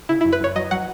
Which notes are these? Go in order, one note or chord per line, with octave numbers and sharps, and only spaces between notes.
C#3 E4
F#2 E4
B4
F#2 C#5
F#3 D#5
F#3 F#5